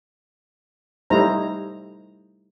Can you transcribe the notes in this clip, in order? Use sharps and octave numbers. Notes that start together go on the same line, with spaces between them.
G3 A3 D#4 E4 C5 A#5